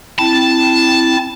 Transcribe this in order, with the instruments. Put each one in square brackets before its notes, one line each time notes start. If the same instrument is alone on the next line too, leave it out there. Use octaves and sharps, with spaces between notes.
[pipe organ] C4 E4 [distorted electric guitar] A5